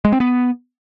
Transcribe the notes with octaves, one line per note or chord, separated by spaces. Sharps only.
G#3
C4
B3